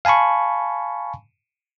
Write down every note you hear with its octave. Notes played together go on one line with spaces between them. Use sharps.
F5 G#5 A5 B5 C#6